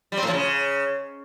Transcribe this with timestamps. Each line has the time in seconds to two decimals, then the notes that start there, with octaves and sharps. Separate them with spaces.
0.12 G3
0.17 C4
0.23 A2
0.28 F3
0.33 C#3